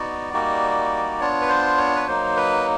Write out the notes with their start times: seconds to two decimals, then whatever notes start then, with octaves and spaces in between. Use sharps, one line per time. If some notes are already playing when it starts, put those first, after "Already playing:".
Already playing: B3 D#4 F#4 D5
0.33 G3 A#3 D#4 F#4
1.21 B3 D4 F4 C#5
1.41 B4
1.49 C5
1.78 C#5
1.96 B4
2.07 F#3 A#3 D#4 C5
2.36 B4